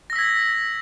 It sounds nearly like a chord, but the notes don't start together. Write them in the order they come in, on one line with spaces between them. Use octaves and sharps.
A#6 E6 B6 G#6